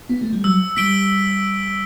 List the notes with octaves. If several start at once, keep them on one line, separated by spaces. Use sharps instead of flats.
B3
A3
G3
F#3 E6
G3 B6 D7 G7